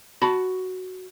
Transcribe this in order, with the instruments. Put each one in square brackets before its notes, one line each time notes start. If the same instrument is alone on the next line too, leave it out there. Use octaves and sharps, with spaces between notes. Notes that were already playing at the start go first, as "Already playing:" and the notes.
[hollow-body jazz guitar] F#4 A5 B5